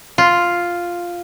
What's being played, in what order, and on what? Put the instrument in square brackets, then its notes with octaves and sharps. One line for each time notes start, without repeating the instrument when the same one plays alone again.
[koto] F4